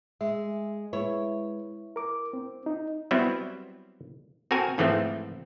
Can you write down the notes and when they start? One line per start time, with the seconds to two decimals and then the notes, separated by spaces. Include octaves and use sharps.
0.21 G#3 E5
0.93 G#3 E4 B4 C#5
1.96 A#4 D6
2.33 C4
2.66 D#4
3.11 F#3 G3 B3 C4 E4
4.51 C4 F#4 A4 A#4 G#5
4.78 G#2 E3 F3 A3 C4